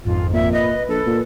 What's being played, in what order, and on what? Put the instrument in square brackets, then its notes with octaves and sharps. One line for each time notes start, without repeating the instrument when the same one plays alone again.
[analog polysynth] G#1 F2 G#2 [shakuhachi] F4
[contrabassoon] A#2 [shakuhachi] E5
[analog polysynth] B4 [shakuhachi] D#5
[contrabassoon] A#1 [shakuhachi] A4
[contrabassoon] A#2